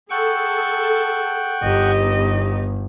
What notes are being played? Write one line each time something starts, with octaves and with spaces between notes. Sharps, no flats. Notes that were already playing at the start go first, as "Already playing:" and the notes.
G#4 A4 F#5 G5 C#6
G1 B3 D#4 G4 D#5